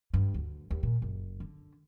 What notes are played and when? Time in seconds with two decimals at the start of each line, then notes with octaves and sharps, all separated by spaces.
0.14 G2
0.34 D2
0.71 D#2
0.83 A#2
1.02 F#1
1.40 D3